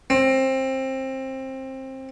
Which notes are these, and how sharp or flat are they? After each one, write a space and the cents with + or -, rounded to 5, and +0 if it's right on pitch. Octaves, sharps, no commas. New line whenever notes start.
C4 +20